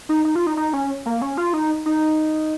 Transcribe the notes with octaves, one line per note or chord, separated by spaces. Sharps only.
D#4
D#4
F4
D#4
D#4
C#4
A#3
C#4
F4
D#4
D#4